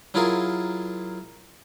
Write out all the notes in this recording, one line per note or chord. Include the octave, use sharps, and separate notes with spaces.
F#3 E4 F4 G#4 A#4